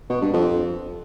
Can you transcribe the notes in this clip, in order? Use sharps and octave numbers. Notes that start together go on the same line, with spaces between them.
B2
G2
F2